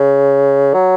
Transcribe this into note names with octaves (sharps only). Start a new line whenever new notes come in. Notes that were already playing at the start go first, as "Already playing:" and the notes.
Already playing: C#3
F#3